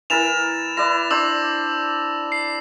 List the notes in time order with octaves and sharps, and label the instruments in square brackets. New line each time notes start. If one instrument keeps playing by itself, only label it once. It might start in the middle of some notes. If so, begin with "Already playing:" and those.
[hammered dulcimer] E3 E4 A#4 [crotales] A6 E7 F7
[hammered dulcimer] E4 B4 D5 [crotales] A#6
[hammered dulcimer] D4 C5 [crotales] D6 E6 E7
[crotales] C7